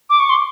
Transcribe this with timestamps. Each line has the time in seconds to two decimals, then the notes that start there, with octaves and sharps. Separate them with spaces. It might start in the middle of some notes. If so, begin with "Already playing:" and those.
0.10 D6
0.20 C#6
0.30 C6